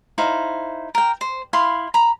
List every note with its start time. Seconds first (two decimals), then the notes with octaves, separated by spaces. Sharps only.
0.18 D#4 E4 C5 F5
0.95 A#4 G5
1.21 C5
1.53 E4 F5 B5 C6
1.94 A#5 B5